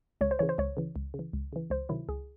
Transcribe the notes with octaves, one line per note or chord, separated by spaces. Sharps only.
C#2 C#5
C5
C#3 E3 C#5
C5
C#2 C#5
C#3 E3
C#2
C#3
E3
C#2
C#3 E3
C#2 C5
C3 D#3 F#3 E4
C#2 G#4